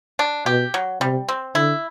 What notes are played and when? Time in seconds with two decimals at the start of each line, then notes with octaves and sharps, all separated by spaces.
0.19 D4
0.46 B2 G4
0.74 F#3
1.01 C3 G3
1.28 C4
1.55 D3 E4